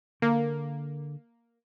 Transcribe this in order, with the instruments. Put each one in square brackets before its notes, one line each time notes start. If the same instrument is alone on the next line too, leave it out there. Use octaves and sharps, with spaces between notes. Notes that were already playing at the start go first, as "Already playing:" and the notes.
[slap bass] D3 [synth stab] A#3